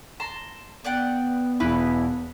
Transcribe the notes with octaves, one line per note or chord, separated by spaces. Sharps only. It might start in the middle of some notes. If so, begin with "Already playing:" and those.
A5 A#5 C6
B3 D5 F#5 G5
E1 E2 E4 B4